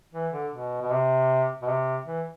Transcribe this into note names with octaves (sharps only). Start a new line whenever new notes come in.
E3
D3
B2
B2
C3
B2
C3
E3